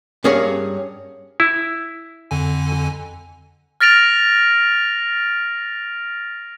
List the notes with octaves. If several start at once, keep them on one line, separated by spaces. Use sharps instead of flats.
G2 C#4 G#4 A#4 C#5 F#5
E4
F2 D3 G#5
F6 A6 A#6 D7 F7